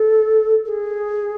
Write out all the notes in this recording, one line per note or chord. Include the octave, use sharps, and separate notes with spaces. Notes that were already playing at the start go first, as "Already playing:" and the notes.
Already playing: A4
A4
G#4